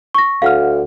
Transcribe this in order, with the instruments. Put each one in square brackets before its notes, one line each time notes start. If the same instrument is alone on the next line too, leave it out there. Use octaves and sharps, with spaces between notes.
[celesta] C#6 A#6
[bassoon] D2 [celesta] F5 F#5 F6